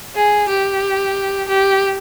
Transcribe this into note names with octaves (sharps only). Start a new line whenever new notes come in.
G#4
G4
G4